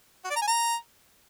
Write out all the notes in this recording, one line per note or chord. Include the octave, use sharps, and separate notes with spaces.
F#4
D5
A#5
G#5
A#5